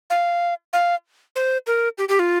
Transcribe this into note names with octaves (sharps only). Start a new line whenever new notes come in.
F5
F5
C5
A#4
G4
G4
F4